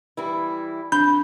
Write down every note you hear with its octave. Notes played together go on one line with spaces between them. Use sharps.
E3 G3 E4
F2 D4 B5 G6